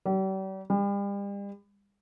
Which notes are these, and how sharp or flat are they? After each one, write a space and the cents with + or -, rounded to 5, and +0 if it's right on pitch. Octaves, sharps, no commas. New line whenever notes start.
G3 -40
G3 +40